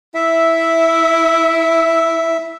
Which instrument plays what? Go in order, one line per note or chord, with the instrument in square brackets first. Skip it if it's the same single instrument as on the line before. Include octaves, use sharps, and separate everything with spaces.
[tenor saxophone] E4 [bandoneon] E5